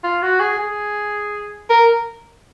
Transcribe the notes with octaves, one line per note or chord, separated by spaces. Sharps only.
F4
F#4
G#4
G#4
A#4